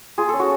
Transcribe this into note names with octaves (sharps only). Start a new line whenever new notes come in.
F4 G#4
C#4 A4
F#4